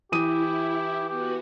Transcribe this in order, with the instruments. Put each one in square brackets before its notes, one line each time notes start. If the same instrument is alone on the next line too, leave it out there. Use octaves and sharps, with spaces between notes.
[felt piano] E3 D#6 D#7 [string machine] E4 [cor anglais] G4
[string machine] B3 F#4 [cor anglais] G4